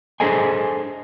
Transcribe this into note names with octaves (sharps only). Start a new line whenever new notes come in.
D4 G#4 A4 C5 D#5 G#5